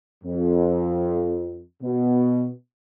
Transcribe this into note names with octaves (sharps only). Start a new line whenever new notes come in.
F2
B2